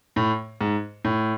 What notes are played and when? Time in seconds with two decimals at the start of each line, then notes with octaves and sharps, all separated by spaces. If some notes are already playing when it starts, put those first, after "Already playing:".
0.16 A2
0.61 G#2
1.05 A2